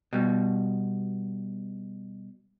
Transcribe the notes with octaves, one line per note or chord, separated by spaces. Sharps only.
B2 G3